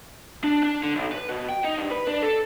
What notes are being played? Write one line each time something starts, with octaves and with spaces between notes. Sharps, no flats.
D4
D4
D3
B1
B4
B2
G5
D#4
G2
B4
D4
A4